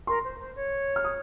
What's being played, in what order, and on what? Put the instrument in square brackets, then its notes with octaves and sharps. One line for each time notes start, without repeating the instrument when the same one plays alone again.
[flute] A#4 [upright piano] C6
[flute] C5
C5
C#5
[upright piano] F6
D#6